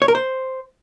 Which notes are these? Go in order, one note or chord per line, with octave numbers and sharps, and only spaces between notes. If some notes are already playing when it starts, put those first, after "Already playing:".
C#5
A#4
C5